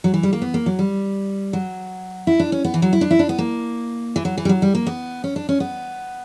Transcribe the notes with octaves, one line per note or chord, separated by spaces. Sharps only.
F#3
E3
G3
A#3
B3
A#3
F#3
G3
F#3
E4
D4
C#4
B3
E3
F#3
E4
D4
E4
D4
B3
A#3
E3
F#3
E3
G3
F#3
G3
A#3
B3
C#4
D4
C#4
B3